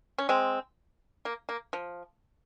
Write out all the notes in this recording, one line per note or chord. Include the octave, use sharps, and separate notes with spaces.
C#4
G#3 C4
A#3
A#3
F3